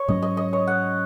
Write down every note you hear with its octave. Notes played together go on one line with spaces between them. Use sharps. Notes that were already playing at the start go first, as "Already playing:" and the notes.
Already playing: C#5
G#2 F#3 C#4 D#5
D#5
D#5
C#5
F#5